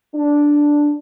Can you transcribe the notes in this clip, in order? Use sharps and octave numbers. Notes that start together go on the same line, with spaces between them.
D4